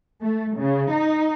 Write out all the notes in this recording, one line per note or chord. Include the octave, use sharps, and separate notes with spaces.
A3
C#3
D#4